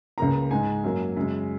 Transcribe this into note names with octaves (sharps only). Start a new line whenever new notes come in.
C#2 C#3 A#3 A#5
G#2 G#3 G#5
F#2 F#3 A#3
F#2 C#3 G#3